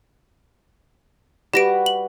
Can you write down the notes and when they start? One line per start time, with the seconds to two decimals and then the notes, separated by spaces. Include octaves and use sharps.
1.54 G3 F#4 G4 B4 A#6 D7
1.86 F#7